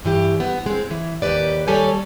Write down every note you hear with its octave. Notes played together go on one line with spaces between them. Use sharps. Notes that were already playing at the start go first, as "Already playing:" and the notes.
G2 E3 G4
B3
G#3 C4
E3
D#2 G4 B4 D5
D#2 G3 G4 A4 C#5 G#5